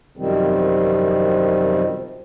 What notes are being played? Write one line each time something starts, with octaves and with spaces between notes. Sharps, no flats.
F#2 C3 D#3 F3 G3 C4